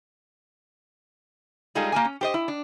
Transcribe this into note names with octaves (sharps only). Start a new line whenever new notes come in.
G3 G#3 D#4 F4 G#4 A4
A#3 G4 A#4 G#5
C#4
G4 C5 D#5
E4
D4